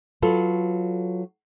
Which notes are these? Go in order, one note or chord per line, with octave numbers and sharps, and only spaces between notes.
F#3 F4 A4 B4